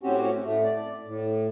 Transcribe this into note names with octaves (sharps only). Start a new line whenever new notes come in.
A2 C4 C#4 F#4 G4
A2 A3
D5
A2